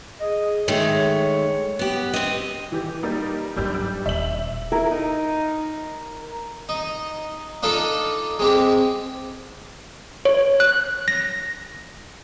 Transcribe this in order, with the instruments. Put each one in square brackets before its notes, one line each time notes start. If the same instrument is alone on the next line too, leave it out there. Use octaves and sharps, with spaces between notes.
[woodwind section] G#4 D#5
[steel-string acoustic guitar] D#3 G#3 A3 [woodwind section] C#5
[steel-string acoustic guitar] B3 G4
C4 D#5
[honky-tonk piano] E3 G4
G3 A#3 D#4
[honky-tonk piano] G#1 G3 G6 [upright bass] F#3 D4
[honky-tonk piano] G3
[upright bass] D#1 [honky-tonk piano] E5 F#7
[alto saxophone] E4 [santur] A#4
[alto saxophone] D#4
[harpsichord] D#4
D4 D#4 F4 A4 B5 D6
G#3 C4 G4
[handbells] C#5
F#6
A#6